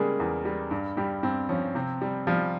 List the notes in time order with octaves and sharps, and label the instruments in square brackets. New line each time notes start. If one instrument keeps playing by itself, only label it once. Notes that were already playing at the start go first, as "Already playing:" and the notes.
Already playing: [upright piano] C#3 G3 G#3 A#3 G#4 A#4
E2
G3
G2
G2 G3 G4
G2 C4
F3 C#4
C3 C4
G3
F3 G3 F4